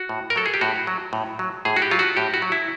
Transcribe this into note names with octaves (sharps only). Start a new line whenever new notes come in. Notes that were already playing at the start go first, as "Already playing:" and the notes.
Already playing: F#4
A2
A#4
F#3 A4
G#4
G4
A2 F#4
F#3
A2
F#3
A2 G#4
F#4
G4
F#3 F4
F#4
A2 G4
F#4
F#3
E4